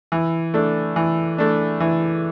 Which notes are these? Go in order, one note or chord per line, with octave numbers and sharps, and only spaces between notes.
E3
A3 D4
E3
A3 D4
E3